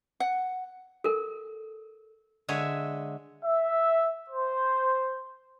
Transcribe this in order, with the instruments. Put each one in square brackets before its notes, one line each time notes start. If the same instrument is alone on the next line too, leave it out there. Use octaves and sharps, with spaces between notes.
[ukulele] F#5
[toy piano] A4 A#4
[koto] D3 G#3 C#5 E5
[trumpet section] E5
C5